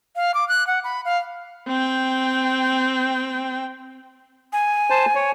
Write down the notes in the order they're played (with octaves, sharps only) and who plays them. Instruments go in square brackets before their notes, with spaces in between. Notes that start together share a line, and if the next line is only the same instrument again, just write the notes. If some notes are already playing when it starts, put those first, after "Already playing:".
[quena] F5
D6
F#6
F#5
B5
F5
[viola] C4 G5
[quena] G#5
[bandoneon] C5 A5
C#5